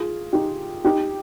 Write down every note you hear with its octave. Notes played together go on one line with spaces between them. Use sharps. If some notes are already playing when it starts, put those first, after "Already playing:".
Already playing: F4 G#4
D#4 G4
D#4 G4